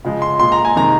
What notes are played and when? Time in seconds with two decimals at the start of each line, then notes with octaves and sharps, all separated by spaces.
0.05 C#3 F3 G#3
0.22 C6
0.39 A#2 G#3 C6
0.52 A#5
0.65 G#5
0.75 C3 D#3 G#3 A#5